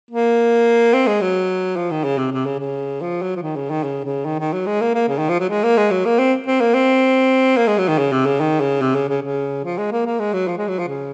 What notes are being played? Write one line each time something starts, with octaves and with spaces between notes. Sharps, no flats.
A#3
C4
G#3
F#3
F3
D#3
C#3
C3
C3
C#3
C#3
F3
F#3
F3
D#3
C#3
D#3
C#3
C#3
D#3
D#3
F#3
G#3
A#3
A#3
C#3
D#3
F3
F#3
G#3
A#3
G#3
F#3
A#3
C4
C4
A#3
C4
A#3
G#3
F#3
D#3
C#3
C3
C#3
D#3
C#3
C3
C#3
C#3
C#3
F3
G#3
A#3
A#3
G#3
F#3
F3
G#3
F#3
F3
C#3